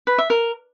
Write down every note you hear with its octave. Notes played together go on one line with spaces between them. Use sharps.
B4
E5
A#4